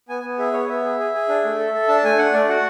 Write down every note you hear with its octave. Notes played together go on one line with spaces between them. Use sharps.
B3 G#5
B3
G#4 E5
B3 C#5
B3 E5
G#4
G#4
G#4
D4
A3
A4
A4
D4 A5
A3 G#5
D4 F#5
A3 D5
F#4 F#5